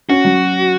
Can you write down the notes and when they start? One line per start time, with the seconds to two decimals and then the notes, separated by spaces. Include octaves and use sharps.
0.09 C#4 F#4
0.25 F#3